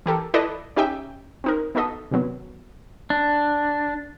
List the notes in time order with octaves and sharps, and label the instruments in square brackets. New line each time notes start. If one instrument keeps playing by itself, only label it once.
[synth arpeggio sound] E3 G4 A4 A#4
E4 A4 B4 D5 D#5
C#4 D#4 G4 E5 G5
C4 D#4 A#4
B3 D#4 F#4 A4 D#5
C3 D#3 F#3 B3
[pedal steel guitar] D4